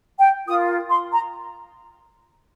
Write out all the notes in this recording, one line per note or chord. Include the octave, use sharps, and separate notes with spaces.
G5
F4 A#4 D#6
C6
A#5